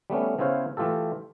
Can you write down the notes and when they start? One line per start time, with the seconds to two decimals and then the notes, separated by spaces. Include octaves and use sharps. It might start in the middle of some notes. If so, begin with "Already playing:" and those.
0.10 G3 A3 B3 C#4
0.39 C#3 B3 E4 C5 C#5 F5
0.77 E3 A3 F4 G4 A4